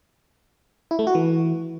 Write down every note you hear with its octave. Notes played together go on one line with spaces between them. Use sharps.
E4
A3
F#4
E3